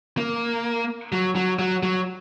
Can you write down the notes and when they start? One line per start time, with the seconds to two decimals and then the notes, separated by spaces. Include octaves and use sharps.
0.17 A#3
1.12 F#3
1.36 F#3
1.59 F#3
1.83 F#3